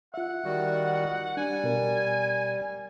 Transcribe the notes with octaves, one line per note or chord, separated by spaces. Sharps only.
F4 E5 F#5
D#3 G3 F#4
G3 D4 G#5
B2 A#4